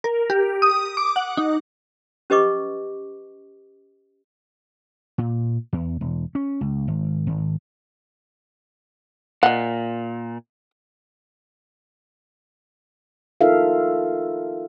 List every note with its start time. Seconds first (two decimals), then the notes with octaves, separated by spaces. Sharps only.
0.04 A#4
0.30 G4
0.62 D#6
0.97 D6
1.16 F#5
1.37 D#4
2.30 C#4 G4 B4 D#5 C#6 D6
5.18 A#2
5.73 E2
6.01 E1
6.35 C#4
6.61 C#2
6.88 G#1
7.27 G#1
9.43 A#2 D#5 F#5
13.41 D#4 F4 A4 A#4 E5 F5